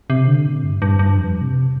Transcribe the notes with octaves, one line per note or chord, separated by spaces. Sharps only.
C3
D3
A#2
G2
G2
G2
F2
C3